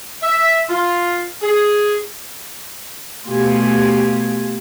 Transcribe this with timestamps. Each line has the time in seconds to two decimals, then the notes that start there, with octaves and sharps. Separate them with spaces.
0.23 E5
0.69 F4
1.42 G#4
3.26 B2 A3 F4 G4 G#5